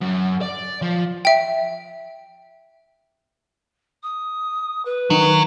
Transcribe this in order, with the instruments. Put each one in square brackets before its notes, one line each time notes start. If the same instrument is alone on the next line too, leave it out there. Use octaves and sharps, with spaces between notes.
[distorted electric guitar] F#2
D5
F3
[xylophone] E5 G5
[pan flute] D#6
B4
[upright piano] D#3 [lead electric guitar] F#3